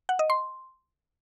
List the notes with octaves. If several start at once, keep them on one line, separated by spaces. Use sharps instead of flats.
F#5
D#5
C6